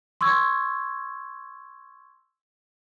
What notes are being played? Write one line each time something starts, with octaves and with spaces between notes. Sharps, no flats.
C6 C#6 E6 G#6